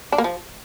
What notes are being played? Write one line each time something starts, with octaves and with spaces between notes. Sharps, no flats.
D4
A#3
F3